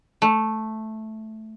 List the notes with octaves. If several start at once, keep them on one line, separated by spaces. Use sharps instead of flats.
A3